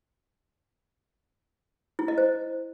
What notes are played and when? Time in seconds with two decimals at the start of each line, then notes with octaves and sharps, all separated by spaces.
1.99 E4
2.08 D#5
2.18 C5